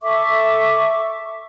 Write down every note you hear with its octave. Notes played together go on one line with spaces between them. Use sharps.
A4 E5 C#6 D6